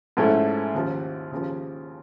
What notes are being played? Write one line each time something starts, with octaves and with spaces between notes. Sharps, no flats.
G#2 F3 A3 C#4 E4
D#2 C#3 F3
D#2 C#3 F3